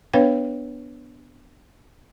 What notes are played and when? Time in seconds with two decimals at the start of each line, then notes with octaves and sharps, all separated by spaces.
0.13 B3 D4 B4 C#5 F5 G5